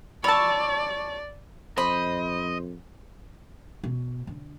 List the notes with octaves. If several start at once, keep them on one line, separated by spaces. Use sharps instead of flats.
C#5 D5 A5 B5 E6
F2 C5 D#5 B5
B2
D3